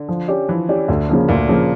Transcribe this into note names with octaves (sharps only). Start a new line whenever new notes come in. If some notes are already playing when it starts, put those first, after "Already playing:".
Already playing: D3
F3
C#4 G4 D5
E3 F3
C#4 G4 D5
D2 D3
C#3 F3 A#3
D2 A#2
C#3 F3 A#3